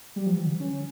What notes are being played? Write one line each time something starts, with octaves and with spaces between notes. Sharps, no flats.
G3
F3
E3
D3
C#4